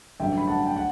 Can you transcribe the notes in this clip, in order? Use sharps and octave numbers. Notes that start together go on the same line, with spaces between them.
A1 G2 D3 F#3 E5 G5
B5
F#5 A5
G5
F#5